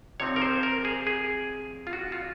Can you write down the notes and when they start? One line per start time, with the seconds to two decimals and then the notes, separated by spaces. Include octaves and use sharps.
0.20 F2 C3 F3 C4 D#4 C#5
0.36 A#4
0.42 C5
0.63 A#4
0.85 G#4
1.07 G#4
1.87 F4
1.93 F#4
2.12 F4